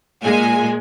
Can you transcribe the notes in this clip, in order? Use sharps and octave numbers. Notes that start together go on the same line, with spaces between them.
A#2 G#3 G#5